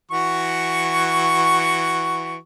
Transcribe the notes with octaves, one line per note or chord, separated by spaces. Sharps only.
E3 F#4 C#6